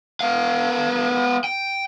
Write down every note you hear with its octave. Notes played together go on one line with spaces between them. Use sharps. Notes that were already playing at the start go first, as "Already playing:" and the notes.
B3 F5
G5